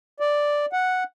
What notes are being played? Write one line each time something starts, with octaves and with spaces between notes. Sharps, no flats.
D5
F#5